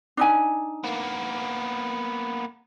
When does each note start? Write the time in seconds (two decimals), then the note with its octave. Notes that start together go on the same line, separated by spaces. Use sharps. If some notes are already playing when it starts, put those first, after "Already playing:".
0.17 D4 D#4 G#5
0.84 A#3 B3